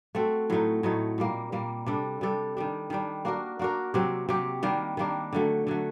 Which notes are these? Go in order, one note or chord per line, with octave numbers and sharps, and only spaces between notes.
A3 C4 F#4 A4
A2 F#3 A3 D#4
A2 F#3 A3 D#4
A#2 G3 A#3
A#2 G3 A#3
C3 G3 D4 A4
C3 G3 D4 A4
D#3 G3 D4
D#3 G3 D4
A#3 D4 F#4 A#4
A#3 D4 F#4 A#4
C3 F#3 C4 G4
C3 F#3 C4 G4
D#3 G3 A#3 D4
D#3 G3 A#3 D4
D3 F#3 A3
D3 F#3 A3